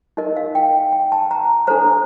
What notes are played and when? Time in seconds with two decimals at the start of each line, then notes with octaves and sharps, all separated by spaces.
0.17 D#4 A#4 D#5
0.36 F5
0.55 G5
0.92 G5
1.12 A5
1.31 A#5
1.67 D4 A4 C5 A#5